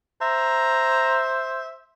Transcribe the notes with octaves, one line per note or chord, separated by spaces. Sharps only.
C5 E5 A#5